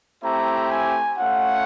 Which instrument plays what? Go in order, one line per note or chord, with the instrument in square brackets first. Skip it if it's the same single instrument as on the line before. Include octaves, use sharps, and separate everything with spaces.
[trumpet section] A3 C4 E4 G4 A#5
G#5
A3 C#4 F4 F#5